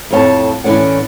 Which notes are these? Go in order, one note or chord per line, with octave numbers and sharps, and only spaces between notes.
F2 A2 C#5 G5 A5
A2 E3 C#4 D5 F#5